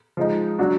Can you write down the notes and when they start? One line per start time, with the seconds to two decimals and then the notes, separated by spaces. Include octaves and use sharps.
0.17 F3 G#3 D#4
0.59 F#3 D4 F#4